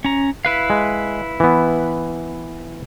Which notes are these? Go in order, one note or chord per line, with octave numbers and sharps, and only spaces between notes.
C#4 A#5
E4 B4 F5
G#3
E3 B3